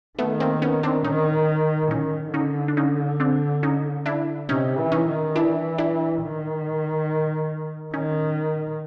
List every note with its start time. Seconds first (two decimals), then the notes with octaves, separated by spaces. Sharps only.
0.19 D#3 A3 B3
0.40 A#3 C4
0.62 B3 C#4
0.83 C4 D4
1.04 D#3 C#4 D#4
1.91 D#3 C#4 D#4
2.34 D3 C#4 D#4
2.68 D4
2.77 C#4 D#4
3.20 C4 D4
3.63 C#4 D#4
4.06 D4 E4
4.49 C3 C#4 D#4
4.78 E3
4.92 C#4 D#4
5.07 D#3
5.35 E3 D4 E4
5.78 D4 E4
6.22 D#3
7.94 D#3 C#4 D#4